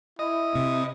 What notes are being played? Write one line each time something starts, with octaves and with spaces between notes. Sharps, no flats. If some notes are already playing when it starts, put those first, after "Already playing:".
E4 D#5
C3